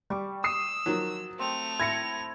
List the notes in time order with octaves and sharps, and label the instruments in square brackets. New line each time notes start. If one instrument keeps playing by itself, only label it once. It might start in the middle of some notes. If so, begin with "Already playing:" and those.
[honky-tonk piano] G3 [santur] C#6 D6
[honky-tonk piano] D#6 C7 [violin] E6
[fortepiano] D#3 F3 F#3
[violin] A3 F7 [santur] C4 G5
[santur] E4 [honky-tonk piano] G#6 A#6 C#7